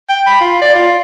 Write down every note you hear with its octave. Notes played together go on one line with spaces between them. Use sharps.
G5
B5
F4
D5
F4